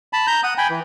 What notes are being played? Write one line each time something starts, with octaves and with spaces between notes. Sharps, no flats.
A5 B5
A#5 G6
F#5 D#6
G5 G#5 B5
E3